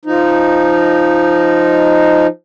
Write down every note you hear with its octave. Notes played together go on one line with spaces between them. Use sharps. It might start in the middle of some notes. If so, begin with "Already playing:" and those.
F3 D#4